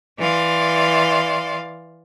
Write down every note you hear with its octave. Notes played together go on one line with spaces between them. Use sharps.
E3 D5 F5 C6